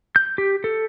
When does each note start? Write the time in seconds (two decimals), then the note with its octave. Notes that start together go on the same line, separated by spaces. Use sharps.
0.16 G6
0.38 G4
0.64 A4